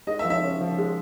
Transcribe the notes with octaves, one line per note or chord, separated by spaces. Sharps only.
G#3 D#5
E5
F3
E5
C#4
F3
G#3